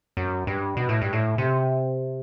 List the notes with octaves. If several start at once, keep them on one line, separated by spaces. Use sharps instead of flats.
F#2
G2
B2
A2
G2
A2
C3